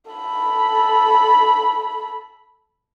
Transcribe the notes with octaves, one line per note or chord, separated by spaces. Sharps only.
A4 B5